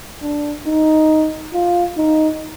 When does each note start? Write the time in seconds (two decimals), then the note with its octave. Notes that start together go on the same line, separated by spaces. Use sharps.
0.22 D4
0.67 D#4
1.54 F4
1.97 D#4